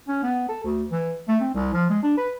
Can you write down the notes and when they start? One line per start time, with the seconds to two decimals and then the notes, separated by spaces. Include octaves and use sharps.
0.08 C#4
0.23 B3
0.49 A4
0.64 D2
0.92 E3
1.28 A3
1.40 C4
1.54 C2
1.73 F3
1.89 G#3
2.03 D4
2.17 B4